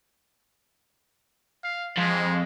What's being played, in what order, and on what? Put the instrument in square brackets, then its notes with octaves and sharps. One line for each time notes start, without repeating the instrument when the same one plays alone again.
[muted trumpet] F5
[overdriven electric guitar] F2 [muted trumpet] G#3